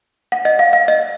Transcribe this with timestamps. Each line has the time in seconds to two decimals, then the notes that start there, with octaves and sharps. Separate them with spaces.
0.32 F#5
0.45 D#5
0.59 F5
0.73 F5
0.88 D#5